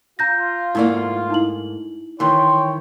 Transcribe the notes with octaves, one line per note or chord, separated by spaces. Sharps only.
F4 A#5 G6 A#6
G#2 A3 A#3 E4 D5
D#4 E4 F#7
D#3 E3 C#5 G5 C6